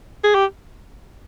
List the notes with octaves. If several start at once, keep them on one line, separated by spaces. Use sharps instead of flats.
G#4
G4